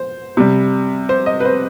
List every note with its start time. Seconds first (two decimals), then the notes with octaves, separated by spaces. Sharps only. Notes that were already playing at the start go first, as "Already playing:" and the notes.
Already playing: C5
0.37 C3 G3
1.09 C5
1.26 D#5
1.40 B4
1.45 C5